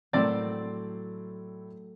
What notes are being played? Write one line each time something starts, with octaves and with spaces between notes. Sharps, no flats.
A2 F#3 A3 C4 D5 E6 A6